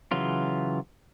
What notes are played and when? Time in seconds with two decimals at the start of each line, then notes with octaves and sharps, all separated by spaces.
0.11 C#3 E3 F#3 F4